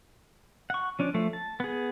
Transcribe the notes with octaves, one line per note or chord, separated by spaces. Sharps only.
F#5 C#6
F3 C#4 D4
F3 A3
A5
B3 G#4